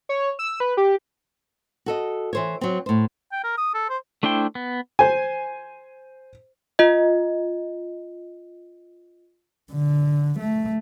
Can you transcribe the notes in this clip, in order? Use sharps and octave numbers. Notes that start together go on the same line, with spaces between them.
C#5
E6
B4
G4
F#4 A4 D#5
E3 C5 C#5
F#3 C4
A2 C5
G5
A#4
D#6
A4
C5
A3 D4 E4 C5 G5
B3
C5 G#5
F4 D#5
D3
A3